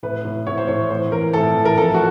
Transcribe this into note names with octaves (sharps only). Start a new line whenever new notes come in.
A2 B4
A2
A2 C#5
C5
A2 C#5
E3 C5
E3 A#4
A2 A4
E3
A#4
F3 A4
F#4